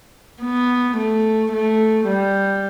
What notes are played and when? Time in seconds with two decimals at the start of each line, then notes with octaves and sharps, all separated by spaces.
0.43 B3
0.97 A3
1.53 A3
2.08 G3